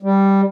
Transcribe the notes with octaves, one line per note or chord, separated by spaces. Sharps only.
G3